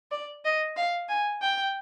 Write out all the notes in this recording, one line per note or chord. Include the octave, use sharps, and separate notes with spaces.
D5
D#5
F5
G#5
G5